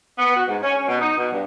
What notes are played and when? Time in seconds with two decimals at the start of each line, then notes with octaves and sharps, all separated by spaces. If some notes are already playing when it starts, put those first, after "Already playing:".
0.19 B3
0.35 F#4
0.48 G#2
0.62 C#4
0.76 C#4
0.87 B2
1.01 D#4
1.17 B2
1.32 G2